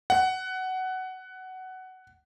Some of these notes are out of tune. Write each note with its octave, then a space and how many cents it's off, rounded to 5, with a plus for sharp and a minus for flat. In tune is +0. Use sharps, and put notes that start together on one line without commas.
F#5 +15